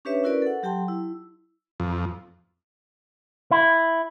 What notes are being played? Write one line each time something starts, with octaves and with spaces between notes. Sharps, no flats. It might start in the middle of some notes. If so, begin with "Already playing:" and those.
C#4 D4 G4 B4 C#5 E5
C#4 E4 F#4 A#4 B4 D5
A4 F#5
F#3 G4 F#5 G5 A5 C6
E4
F2
E4